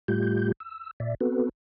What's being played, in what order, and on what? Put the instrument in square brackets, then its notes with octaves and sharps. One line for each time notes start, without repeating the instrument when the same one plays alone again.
[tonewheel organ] A2 G3 A3 F4 G4 G6
E6
A#2 D5 E5
B3 C4 F#4 A4 B4